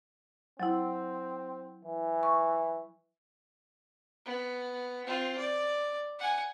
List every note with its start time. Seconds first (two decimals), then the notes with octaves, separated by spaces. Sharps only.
0.60 F#3 C4 E4
1.85 E3
2.23 C#6
4.26 B3
5.06 C4 F4
5.38 D5
6.19 F#5 G#5